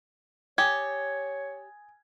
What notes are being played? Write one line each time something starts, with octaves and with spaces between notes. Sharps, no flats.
G4 C#5 G#5 D#6 G#6 A6